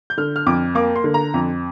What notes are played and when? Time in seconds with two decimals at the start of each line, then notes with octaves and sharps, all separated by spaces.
0.10 G6
0.18 D3 F6
0.36 F6
0.46 F2 D6
0.75 A#3 D6
0.96 C6
1.04 D3
1.14 A#5
1.34 F2